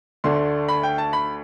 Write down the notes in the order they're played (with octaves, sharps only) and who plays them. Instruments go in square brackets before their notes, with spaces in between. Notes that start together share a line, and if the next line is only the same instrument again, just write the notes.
[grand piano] D2 D3 A3 D4 C6
B5
G5
A5
B5